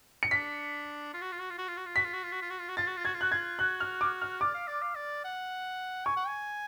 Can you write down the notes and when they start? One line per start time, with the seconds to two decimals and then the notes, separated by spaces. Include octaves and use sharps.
0.23 C#7
0.31 D4 B6
1.13 F4
1.21 F#4
1.32 F4
1.40 F#4
1.50 F4
1.58 F#4
1.68 F4
1.77 F#4
1.86 F4
1.95 F#4 B6
2.04 F4
2.13 F#4
2.23 F4
2.32 F#4
2.42 F4
2.50 F#4
2.59 F4
2.68 F#4
2.77 F4 A6
2.87 F#4
2.96 F4
3.05 F#4 G#6
3.14 F4
3.21 F#4 F#6
3.32 F4 G#6
3.59 F#4 F#6
3.80 F6
4.01 D6
4.22 F6
4.41 D5 D6
4.54 F5
4.67 D5
4.82 F5
4.95 D5
5.24 F#5
6.05 G#5 C#6
6.16 F#5
6.27 G#5